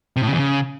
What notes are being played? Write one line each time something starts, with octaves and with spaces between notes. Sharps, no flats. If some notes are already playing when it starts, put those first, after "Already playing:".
C3
A2
C#3
E2
C#3